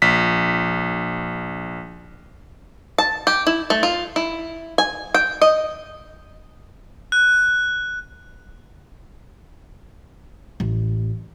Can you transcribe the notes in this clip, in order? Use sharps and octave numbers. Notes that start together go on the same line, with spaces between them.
A#1 B6
A5
G4
E4
A3
F4
E4
G#5
G5
D#5
F#6
A1